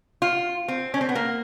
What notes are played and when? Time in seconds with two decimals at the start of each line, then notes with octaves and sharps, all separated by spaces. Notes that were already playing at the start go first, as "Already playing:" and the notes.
0.22 F4
0.68 C4
0.94 C#4
1.01 C4
1.09 B3
1.15 A#3